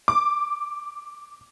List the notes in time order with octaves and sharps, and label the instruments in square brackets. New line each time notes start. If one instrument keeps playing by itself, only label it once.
[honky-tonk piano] D6